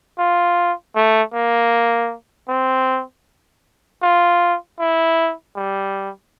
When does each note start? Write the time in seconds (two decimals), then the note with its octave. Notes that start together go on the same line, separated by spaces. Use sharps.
0.19 F4
0.95 A3
1.33 A#3
2.48 C4
4.02 F4
4.79 E4
5.56 G3